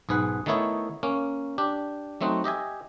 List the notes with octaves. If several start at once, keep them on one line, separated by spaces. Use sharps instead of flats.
B1 G#2 G#4 B4 F#5
D#3 A3 B3 D#4 E4 C#5
A#3 C#4
D4 G4
F#3 A3 C4 D#4 F#4
G4 D#5 E5 G#5